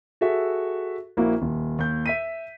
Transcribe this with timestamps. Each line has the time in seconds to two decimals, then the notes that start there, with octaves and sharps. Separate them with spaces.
0.21 F#4 G#4 A4 E5
1.17 A#1 A#3 E4 F#4
1.42 D#1
1.79 D#2 G6
2.06 E5 B6 D#7